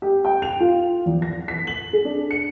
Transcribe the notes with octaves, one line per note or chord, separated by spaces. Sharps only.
G4
G5
F7
F4
E2
A#6
B6
F#7
G#4
D4
C#7